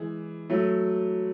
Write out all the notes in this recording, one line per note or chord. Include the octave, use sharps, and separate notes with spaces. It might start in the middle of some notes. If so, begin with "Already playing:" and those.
Already playing: E3 G#3
F#3 A3